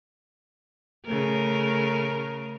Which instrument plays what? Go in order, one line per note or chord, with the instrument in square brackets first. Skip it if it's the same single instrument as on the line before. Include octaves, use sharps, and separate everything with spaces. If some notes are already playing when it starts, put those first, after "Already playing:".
[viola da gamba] C#3 A3 A#4